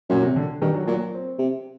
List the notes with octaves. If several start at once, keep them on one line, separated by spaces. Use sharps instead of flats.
F#2 A#2
C3
D3
G2 D#3
F#3
A#2 F#3
C4
C3